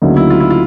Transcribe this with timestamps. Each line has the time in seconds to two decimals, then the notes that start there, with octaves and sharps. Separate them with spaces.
0.02 D2 C#3 F#3 A#3 D#4
0.17 E4
0.30 F4
0.40 E4
0.50 F4